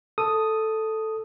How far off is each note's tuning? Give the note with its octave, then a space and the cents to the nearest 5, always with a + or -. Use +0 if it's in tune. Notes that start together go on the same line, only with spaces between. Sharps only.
A4 +0 D#6 +0